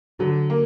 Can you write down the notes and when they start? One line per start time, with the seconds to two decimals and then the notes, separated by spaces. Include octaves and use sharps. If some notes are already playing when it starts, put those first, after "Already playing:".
0.20 D3 F#3
0.50 A#3